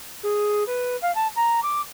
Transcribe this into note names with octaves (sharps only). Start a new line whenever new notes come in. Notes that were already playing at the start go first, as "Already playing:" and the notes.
G#4
B4
F5
A5
A#5
D6